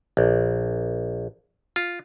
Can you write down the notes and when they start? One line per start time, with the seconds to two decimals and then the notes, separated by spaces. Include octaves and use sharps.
0.17 A#1
1.76 F4